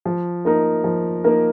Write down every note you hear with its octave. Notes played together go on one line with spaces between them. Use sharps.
F3
A#3 D#4 A#4
F3
A#3 D#4 A#4